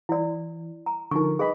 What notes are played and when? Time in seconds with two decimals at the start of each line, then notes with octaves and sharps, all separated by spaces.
0.09 E3 E4 D5
0.86 A#5
1.11 D3 F3 D#4 A#4 C#6
1.39 D4 G#4 B4 D#5 B5